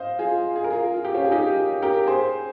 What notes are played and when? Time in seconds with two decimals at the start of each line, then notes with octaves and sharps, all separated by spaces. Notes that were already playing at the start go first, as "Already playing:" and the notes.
Already playing: C5 D#5 F5
0.19 F4 G#4
0.56 G#4
0.64 A#4
0.71 F4 G#4
0.94 F4
1.05 G4
1.15 C#4 F4
1.25 G#4
1.31 D#4 G4
1.82 G4 A#4
2.07 G#4 C5